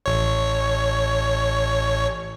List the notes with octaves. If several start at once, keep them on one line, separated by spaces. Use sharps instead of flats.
A1 C#5